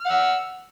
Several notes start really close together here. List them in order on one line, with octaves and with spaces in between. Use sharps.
F6 F#5 E6